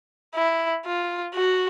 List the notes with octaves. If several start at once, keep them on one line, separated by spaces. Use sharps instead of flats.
E4
F4
F#4